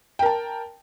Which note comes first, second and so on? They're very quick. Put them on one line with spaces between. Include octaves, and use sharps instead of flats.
G5 A#4 A5